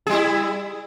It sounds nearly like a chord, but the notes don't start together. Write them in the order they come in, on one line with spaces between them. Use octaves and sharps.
G#4 G3 E4